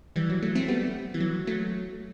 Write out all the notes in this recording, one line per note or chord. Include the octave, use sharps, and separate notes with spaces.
E3 G3
F#3
F#3 A3
A3 C4
G3 B3
E3
F#3
F#3 A3